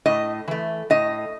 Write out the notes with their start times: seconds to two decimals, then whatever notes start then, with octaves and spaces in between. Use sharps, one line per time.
0.06 A2 D#5
0.48 E3 A3
0.90 A2 D#5